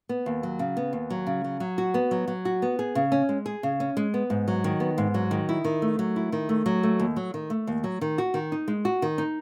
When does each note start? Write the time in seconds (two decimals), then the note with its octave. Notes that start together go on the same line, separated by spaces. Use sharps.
0.09 B3
0.26 D#2
0.43 F#3
0.59 C#3
0.77 B3
0.93 D#2
1.10 F#3
1.27 C#3
1.44 F#3
1.60 F#3
1.78 F#4
1.94 B3
2.11 F#3
2.28 F#3
2.45 F#4
2.62 B3
2.79 G#4
2.95 C#3
3.12 C#4
3.29 G#3
3.46 G#4
3.63 C#3
3.80 C#4
3.97 G#3
4.14 B3
4.30 G#2
4.48 F#3
4.64 D#3
4.80 B3
4.98 G#2
5.14 F#3
5.31 D#3
5.49 E4
5.64 D#3
5.82 A3
5.99 F#3
6.16 E4
6.32 D#3
6.49 A3
6.66 F#3
6.83 A3
6.99 D#2
7.16 F#3
7.34 D#3
7.50 A3
7.67 D#2
7.84 F#3
8.01 D#3
8.18 F#4
8.34 D#3
8.52 D#4
8.68 G#3
8.85 F#4
9.02 D#3
9.18 D#4